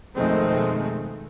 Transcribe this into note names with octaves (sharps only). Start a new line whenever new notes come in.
F2 B2 D#3 G#3 A3 C4